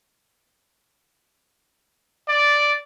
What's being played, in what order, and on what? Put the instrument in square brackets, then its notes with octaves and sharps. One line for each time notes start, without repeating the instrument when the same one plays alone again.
[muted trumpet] D5